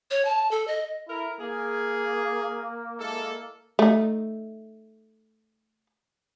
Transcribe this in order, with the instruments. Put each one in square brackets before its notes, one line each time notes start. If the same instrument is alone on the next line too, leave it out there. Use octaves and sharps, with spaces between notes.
[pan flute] C#5
A5
A4
D#5
[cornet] E4 [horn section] A4 A#4
[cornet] A#3 [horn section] G#4
[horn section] G#3 E4 A4
[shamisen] A3 D#4